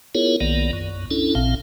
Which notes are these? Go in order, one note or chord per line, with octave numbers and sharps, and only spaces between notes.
B3 E4 F4 G#4 A#4 C#5
B1 D#3 A#3 B3 D5
F#2
C#4 D4 E4 A4
A1 A#2 C4 F5